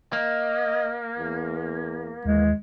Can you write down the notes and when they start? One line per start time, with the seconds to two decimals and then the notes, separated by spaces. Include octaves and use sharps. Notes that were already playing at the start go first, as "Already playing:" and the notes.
0.13 A#3 D#5
1.18 E2
2.25 D#2 E3 G#3